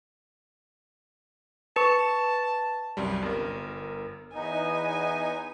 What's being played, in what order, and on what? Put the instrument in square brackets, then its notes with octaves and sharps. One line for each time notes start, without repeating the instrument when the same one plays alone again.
[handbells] B4 C#6 [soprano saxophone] A5
[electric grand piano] C2 F#2 G3
G1 A#4
[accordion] E2 B3 D#4 [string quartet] G#5